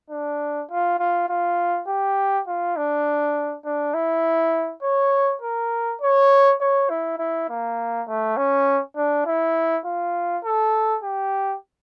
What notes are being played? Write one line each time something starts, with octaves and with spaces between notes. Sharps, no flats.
D4
F4
F4
F4
G4
F4
D4
D4
E4
C#5
A#4
C#5
C#5
E4
E4
A#3
A3
C#4
D4
E4
F4
A4
G4